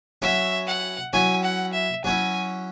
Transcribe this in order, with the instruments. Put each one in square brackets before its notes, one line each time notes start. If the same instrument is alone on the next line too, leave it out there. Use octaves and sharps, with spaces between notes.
[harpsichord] F#3 C#4 E4 [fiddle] E5
[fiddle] F#5
[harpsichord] F#3 C#4 E4 [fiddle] G#5
[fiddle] F#5
E5
[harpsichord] F#3 C#4 E4 [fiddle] G#5